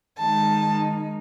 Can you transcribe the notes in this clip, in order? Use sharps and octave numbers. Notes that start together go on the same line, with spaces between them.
D#3 G#3 D#4 A5